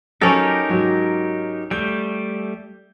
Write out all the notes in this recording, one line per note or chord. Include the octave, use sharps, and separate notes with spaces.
F#3 C#4 D#4 G4 A4 A#4
G#2 F#3 F#4
G3 A3 G6